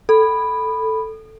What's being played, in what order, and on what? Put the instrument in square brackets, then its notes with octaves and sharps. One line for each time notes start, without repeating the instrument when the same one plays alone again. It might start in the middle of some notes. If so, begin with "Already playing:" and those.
[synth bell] A4 [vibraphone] B5